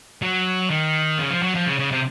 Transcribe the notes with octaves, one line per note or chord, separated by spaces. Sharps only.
F#3
D#3
C#3
F3
F#3
F3
C#3
C#3
C3